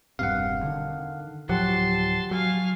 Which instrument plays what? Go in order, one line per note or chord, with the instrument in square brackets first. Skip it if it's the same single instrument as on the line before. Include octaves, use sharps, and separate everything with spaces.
[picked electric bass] E1 G2 C3 [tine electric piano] F5 F#5
[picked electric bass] D3 D#3
[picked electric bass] D1 F3 F#3 [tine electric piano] G4 F#5 [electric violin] A5 C6
[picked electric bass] F#3 [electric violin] F5 G#5